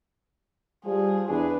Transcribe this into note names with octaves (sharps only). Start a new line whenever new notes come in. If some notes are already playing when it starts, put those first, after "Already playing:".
F3 G3 G#4
E2 D4 G#4 B4